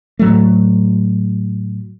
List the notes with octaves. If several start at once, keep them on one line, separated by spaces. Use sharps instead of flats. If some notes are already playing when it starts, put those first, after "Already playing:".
A2 F#3 A3